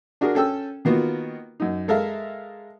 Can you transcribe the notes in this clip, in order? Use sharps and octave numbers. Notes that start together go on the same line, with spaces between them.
D4 F#4 G#4 A#4
C#4 A4 G5 E6
D#3 A#3 B3 F4 F#4
F#2 D#4
G#3 A4 A#4 E5 F5